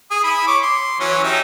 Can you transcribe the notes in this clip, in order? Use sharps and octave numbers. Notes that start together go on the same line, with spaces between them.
G#4 D#6
E4 B5
C#5 D6
C6
E3 F#3 C#4
D#4 G4 E5